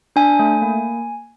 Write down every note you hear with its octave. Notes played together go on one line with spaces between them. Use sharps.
D4 G#5
A3
A#3